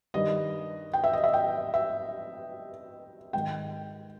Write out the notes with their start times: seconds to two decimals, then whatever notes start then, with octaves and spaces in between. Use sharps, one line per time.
0.14 G2 D#3 D#5
0.93 G5
1.04 E5
1.13 D#5
1.24 E5
1.34 G5
1.74 E5
3.33 G#2 D#3 G5